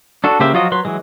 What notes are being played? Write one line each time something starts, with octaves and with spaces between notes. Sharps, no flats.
D4 F#4 A4
C#3 A#3 G4 C5 E5
F3 F#3 F4 F#4 D#5
F#3 B4 C6
E3 F#3 G#3